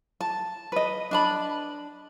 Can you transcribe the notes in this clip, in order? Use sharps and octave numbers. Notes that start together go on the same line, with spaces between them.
A5
B4 D#5
D4 A5 B5